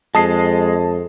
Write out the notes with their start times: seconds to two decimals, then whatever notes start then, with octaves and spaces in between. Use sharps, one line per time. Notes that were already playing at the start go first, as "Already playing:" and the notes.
0.15 F2 G#3 A5 D#6 C7